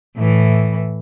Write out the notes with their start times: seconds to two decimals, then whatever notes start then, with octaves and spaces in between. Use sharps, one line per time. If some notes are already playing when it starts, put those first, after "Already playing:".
0.16 A2 E3